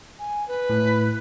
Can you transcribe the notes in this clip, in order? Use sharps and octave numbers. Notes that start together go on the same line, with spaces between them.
G#5
B4
A2